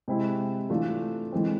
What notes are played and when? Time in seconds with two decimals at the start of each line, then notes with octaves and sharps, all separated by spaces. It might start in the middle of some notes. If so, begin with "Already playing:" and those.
0.08 C3 G#3 C4 E4
0.70 E3 A3 D4 F4
1.32 E3 G#3 C4